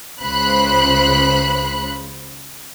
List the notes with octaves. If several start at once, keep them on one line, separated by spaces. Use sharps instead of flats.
C#2 C#3 C5 B5 F#6